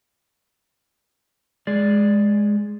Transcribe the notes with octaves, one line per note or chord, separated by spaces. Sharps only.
G#3 G#4 D5